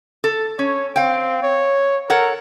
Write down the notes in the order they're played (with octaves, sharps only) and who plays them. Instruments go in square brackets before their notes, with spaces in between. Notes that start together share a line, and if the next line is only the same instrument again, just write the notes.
[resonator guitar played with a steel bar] A4
[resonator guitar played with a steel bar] C#4 [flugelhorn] C#5
[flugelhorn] C4 [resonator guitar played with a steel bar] F5 G5
[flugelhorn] C#5
[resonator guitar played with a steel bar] A4 C#5 F#5 [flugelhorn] A#4